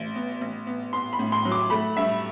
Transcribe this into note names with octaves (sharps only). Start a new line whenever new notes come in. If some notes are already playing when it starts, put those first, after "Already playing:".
Already playing: A1
B3
A1
B3
B3 C6
B5
A2
C6
F#3
D6
A3 B5
G2 E5